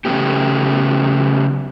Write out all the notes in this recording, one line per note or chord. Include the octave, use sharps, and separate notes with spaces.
C#3 F#3 A3 B3 G4